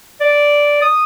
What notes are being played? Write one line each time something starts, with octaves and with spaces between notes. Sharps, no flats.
D5
D#6